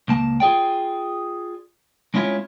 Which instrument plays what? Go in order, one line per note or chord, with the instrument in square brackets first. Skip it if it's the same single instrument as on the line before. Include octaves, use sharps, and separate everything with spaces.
[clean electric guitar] C#2 A#3 A5
F4 G#4 D5 G5
G#3 C4 C#4 E4 F4 C#5